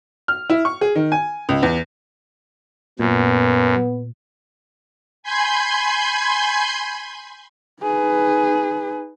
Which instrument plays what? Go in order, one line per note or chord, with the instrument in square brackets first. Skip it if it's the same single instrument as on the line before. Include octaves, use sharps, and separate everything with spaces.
[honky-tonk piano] F6
E4
C#6
G#4
D#3
G#5
C#2
E2
[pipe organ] F#2 [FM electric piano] A#2 [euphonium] B3
[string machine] G#5 B5 C6 G6 G#6
[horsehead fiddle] D#4 B4 [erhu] G#4